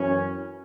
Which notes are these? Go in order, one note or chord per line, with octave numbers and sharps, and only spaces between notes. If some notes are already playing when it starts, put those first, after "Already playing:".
Already playing: F#2 E3 C#4